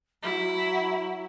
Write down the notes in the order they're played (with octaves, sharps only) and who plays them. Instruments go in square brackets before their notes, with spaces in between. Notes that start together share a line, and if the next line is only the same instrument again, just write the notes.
[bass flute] F#3 [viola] E4